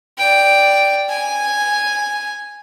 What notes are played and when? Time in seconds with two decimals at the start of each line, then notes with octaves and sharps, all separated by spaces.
0.18 D5 G5
1.09 G#5